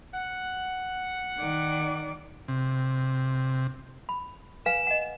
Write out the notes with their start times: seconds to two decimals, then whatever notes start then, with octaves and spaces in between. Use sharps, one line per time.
0.13 F#5
1.38 D#3 D5
2.48 C3
4.09 B5
4.66 B4 F5 G#5 E7
4.87 D#5 F#5